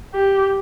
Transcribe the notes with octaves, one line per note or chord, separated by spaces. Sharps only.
G4